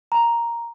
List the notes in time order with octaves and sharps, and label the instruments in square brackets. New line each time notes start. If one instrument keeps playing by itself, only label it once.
[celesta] A#5